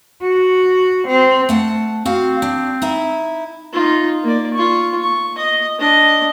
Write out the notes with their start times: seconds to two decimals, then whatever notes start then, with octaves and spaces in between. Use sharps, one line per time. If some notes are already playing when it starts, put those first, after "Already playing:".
0.22 F#4
1.07 C4
1.49 A3 F#5 A5
2.05 C4 F#4 F5
2.42 D4
2.82 D#4 E4 E5
3.73 D#4 F4
4.23 A#3 D5
4.54 F4 C#6
5.03 C#6
5.38 D#5
5.79 D4 D#5